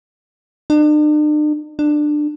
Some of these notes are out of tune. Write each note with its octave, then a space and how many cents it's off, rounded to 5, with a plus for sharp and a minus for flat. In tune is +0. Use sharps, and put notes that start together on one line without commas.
D4 +45
D4 +20